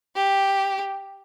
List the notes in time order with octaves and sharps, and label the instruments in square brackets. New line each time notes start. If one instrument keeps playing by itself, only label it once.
[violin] G4